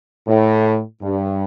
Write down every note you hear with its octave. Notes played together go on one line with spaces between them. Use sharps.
A2
G2